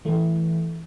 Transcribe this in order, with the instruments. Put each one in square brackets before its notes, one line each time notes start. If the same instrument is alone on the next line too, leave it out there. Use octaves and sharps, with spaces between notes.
[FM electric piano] E3 A3